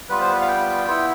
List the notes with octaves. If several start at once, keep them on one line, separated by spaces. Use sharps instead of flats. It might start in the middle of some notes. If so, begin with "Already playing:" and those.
G3 B3 F4 B4
C5
B4
F5
G5
B3 E4